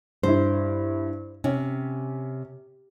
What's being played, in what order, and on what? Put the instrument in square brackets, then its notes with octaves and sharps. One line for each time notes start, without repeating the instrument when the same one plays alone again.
[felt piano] G2 E4 [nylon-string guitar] C5
[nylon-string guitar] C3 [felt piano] C#4